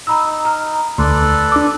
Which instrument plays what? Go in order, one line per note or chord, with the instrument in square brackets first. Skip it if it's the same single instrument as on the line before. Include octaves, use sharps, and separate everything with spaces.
[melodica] D#4 [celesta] A#5 B5 E6
[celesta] A#5 F6
[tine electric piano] D2 [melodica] A4 B4 D5 [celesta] C6
[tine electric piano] D4 D6 [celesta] E6